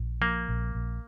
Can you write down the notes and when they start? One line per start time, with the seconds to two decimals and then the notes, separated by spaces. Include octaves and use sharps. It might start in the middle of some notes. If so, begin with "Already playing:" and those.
Already playing: A#1
0.21 F3 A#3
0.49 A#1
0.75 A#1